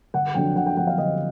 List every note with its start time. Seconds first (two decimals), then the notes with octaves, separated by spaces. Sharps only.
0.14 G1 F#5
0.34 F2 D3 F#3 G5
0.56 G1 F#5
0.66 G5
0.77 F2 D3 F#3 F#5
0.87 F5
0.97 G1 D#5